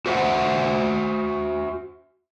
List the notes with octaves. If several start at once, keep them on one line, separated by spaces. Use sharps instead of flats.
F#4 C5 E5 F#5